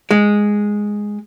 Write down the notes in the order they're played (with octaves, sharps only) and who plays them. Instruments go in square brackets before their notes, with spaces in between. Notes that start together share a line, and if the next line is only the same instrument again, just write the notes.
[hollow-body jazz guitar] G#3